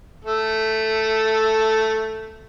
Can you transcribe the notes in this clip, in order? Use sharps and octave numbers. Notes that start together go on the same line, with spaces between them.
A3 A4